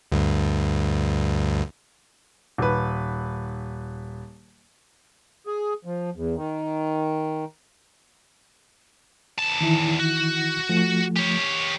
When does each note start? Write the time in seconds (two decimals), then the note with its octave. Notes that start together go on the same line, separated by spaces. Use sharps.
0.12 D2 G2
2.58 D#1 B4
5.47 G#4
5.85 F3
6.15 E2
6.35 D#3
9.38 E2 A5
9.61 D#3 E3 E4
9.99 F#4
10.69 F3 A3
11.16 G4 C#5